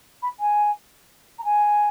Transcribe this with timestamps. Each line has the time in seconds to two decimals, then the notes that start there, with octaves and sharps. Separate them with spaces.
0.22 B5
0.40 G#5
1.39 A#5
1.45 G#5